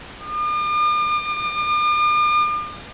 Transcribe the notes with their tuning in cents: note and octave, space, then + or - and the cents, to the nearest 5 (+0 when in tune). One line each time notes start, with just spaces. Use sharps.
D6 +45